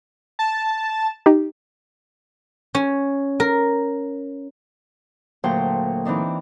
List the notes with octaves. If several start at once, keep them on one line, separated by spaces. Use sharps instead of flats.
A5
D#4 G4
C#4
A#4
D2 A#2 F#3 C5 G5 A5
E3 C4 D4 D#4